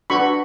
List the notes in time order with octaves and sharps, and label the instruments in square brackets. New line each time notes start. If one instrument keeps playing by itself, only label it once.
[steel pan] D4 F#4 B4 B5 C#6